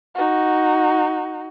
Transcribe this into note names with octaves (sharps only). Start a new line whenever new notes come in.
D#4 F#4